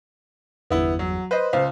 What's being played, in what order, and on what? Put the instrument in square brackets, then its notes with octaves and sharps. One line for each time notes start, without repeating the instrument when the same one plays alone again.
[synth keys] G1 E2 [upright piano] B3 E4
[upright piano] F#3
[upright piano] B4 D#5 [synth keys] C5
[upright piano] C#2 F5 [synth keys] C5